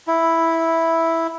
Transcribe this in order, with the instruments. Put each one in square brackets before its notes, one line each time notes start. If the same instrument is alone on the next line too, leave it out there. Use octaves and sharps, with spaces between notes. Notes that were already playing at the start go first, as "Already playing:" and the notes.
[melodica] E4